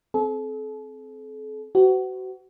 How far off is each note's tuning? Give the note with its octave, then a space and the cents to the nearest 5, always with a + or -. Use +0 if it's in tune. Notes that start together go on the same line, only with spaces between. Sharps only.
C4 +0 A4 -40
F#4 +30 C5 -45